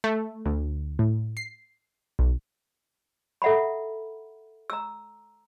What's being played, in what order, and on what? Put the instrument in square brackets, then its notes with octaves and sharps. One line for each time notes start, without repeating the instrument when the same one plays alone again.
[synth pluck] A3
D2
A2
C7
B1
[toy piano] A4 E5 F#5 A#5 B5
A#5 E6